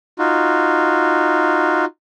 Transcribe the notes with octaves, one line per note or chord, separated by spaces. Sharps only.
D#4 F4 F#4